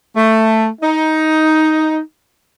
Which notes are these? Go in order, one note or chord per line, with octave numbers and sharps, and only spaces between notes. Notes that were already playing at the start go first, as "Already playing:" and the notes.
A3
D#4